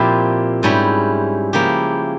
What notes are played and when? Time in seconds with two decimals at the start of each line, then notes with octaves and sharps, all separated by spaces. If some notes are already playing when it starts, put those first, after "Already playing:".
Already playing: A#2 F3 C4 E4 G4
0.63 G#2 G3 C#4 E4
1.53 C#3 F3 A#3 E4 G4